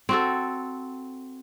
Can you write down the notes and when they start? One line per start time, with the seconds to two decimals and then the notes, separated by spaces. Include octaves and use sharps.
0.09 C4 F#4 A4